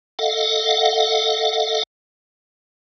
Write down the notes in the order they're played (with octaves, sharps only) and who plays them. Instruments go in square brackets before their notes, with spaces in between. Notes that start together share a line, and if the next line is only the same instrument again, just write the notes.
[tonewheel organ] A4 D#5 F5 F#5